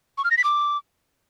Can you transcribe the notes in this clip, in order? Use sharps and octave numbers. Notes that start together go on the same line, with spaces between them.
C#6
F6
A#6
B6
D6